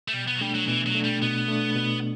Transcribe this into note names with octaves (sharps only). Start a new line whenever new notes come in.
A3
B2 G3
B3
F#3
G3 A3 D4
F#3
B2 E3
F#3
A3 D4
G3
B2 B3
A3 D4
B2